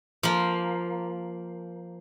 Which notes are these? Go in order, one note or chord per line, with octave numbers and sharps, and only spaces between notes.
F3 A#3